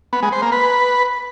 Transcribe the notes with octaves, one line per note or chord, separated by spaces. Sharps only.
B3
G#3
C5
A#3
B4